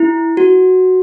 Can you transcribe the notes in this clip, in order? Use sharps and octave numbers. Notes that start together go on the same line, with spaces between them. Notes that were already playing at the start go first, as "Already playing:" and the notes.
Already playing: E4
F#4